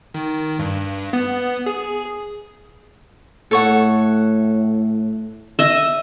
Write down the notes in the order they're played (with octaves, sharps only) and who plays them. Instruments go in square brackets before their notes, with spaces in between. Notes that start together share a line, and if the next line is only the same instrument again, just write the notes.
[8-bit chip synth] D#3
G2
B3
G#4
[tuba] A2 [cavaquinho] A4 C#5 F#5
[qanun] D#5 E5